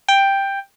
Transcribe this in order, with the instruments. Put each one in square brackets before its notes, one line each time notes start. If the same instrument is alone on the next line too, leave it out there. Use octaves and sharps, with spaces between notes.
[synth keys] G5